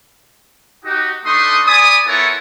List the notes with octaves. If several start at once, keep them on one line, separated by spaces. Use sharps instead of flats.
D#4 F#4 G4
A3 D4 D#4 C6 C#6 D#6
D5 G#5 B5 D#6
B3 E4 F4 A4 A#4 C#5